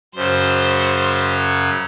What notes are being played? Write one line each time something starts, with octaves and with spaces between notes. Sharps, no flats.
F#2 C#3 F#3 C5